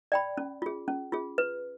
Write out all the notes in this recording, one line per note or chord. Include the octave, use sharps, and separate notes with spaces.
D5 G5 B5
C#4
F4 G#4
C#4
F4 G#4
B4